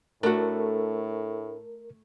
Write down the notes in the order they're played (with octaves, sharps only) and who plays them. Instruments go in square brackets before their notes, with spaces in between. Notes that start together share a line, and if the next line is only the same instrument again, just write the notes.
[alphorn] A2 [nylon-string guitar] A3 [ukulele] D4 F#4 [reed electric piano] A#4